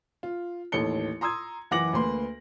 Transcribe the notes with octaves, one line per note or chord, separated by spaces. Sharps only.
F4
A1 D#2 A4 C#5 C#7 G7
A#5 C6 D#6 E6 G#6
F#1 E3 F#5 D6 A#6 F#7
D2 A#3 B4 C6